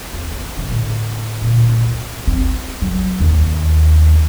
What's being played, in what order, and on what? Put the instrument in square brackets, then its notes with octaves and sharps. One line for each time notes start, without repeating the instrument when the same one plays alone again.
[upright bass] D#2 C4
B3
C#3 F#3
A2 D3
A#2 D3
C#2 A#2
C4
F#3
D#2